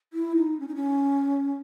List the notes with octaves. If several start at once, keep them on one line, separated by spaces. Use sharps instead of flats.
E4
D#4
C#4
D#4
C#4